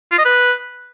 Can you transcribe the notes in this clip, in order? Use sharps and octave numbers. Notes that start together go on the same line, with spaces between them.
F4
D#5
B4